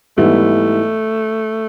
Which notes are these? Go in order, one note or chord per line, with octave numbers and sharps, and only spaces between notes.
G#2 E3 G3 A3 B3 E4